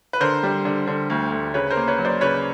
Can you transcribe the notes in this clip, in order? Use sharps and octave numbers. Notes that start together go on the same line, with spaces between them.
B4
D3 A#4 C5
G3
D3
D3
D2
D2
C#3 B4 C#5
A#4 C5
A#3
B4 C#5
F#3
C5 D5
C#3 B4 C#5